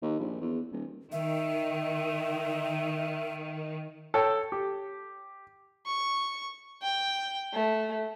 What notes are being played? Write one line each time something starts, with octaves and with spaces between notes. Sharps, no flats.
D#2
A#1
E2
D#1
D#3 E5
A4 C#5 G5
G4
C#6
G5
A3